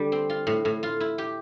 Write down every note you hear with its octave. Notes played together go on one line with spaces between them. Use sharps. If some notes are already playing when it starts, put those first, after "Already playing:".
Already playing: D3 G3
C4
F4
A2
A2
F4
E4
G4